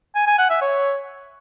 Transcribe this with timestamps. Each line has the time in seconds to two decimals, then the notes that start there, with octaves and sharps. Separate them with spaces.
0.15 G#5
0.27 G#5
0.38 F#5
0.50 E5
0.62 C#5